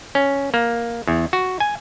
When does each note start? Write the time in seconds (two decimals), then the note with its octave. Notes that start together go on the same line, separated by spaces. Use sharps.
0.15 C#4
0.54 A#3
1.07 E2
1.33 F#4
1.60 G#5